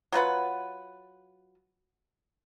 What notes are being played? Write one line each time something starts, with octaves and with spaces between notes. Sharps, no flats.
F#3 F4 B4 F#5